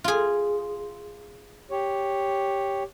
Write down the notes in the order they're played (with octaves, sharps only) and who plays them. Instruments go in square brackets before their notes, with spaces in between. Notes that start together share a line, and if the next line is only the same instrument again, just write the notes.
[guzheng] F4 G#4
[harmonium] G4 C#5